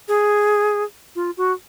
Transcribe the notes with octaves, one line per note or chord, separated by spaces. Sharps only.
G#4
F4
F#4